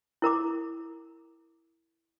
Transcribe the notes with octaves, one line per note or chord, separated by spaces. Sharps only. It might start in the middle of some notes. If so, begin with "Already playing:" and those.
E4 A#4 A#5 D6